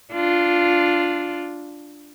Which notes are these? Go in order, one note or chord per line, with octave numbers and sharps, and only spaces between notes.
D4 F4